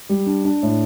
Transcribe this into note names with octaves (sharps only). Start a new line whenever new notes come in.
G3
D4
D4
A2